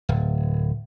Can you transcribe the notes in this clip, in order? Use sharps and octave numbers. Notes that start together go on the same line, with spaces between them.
D1